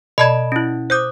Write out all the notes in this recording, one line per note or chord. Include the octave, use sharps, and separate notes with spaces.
B2 D5 D#5 A5 B5 G#6
C#4 E4
C5 D6 D#6 F#6 G6